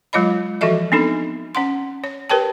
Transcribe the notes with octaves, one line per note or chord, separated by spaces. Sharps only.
F#3 G#3 F4 C#5 D#5 B5
E3 F3 F#4 A4 D#5 E5
B3 C4 D4 D#4 A4
C#4 F#5 C6
C#5
G4 A#4 B4 C#5 G5 A5